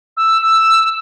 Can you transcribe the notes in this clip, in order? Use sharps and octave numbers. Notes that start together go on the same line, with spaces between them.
E6
E6